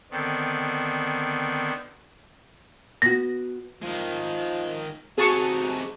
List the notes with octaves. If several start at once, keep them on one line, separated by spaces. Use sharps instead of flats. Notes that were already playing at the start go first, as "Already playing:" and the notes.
D3 D#3 B3 C4
B3 F#4 A#6
D#3 F3 G#3
C3 D#4 F#4 G#4 A5 C#6